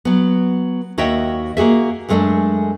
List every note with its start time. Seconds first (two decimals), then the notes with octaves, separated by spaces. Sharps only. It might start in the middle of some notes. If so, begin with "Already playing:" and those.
0.05 F#3 B3
0.98 D#2 F#4 C#5 D#5 E5 G5
1.57 A#3 F#4 G#4 E5
2.09 F#2 G#3 A3 C#4 D4 G#4